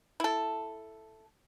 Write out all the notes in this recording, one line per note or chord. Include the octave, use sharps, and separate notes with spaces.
E4 A4